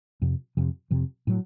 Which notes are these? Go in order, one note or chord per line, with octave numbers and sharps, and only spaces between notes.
F2 C3 F3
F2 C3 F3
F2 C3 F3
A2 F#3